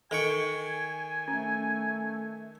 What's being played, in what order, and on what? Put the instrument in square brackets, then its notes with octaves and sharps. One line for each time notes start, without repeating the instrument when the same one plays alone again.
[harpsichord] D#3 G5 C#6 [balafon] A4 [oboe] G#5
[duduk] A3 [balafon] C#4